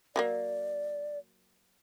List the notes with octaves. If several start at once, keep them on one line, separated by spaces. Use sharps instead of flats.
F#3 A3 A#3 D5